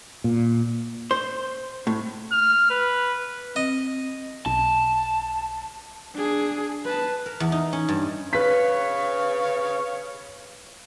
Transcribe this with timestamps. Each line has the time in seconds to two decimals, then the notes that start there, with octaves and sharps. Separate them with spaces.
0.24 A#2
1.11 C5
1.87 A2
2.32 F6
2.70 B4
3.56 C4 D#5
4.46 B1 A5
6.15 D4 G#4
6.85 B4 A5
7.26 A#4
7.40 E2
7.52 D#4
7.73 C#4
7.89 G2
8.33 B4 C#5 F5 C#6 B6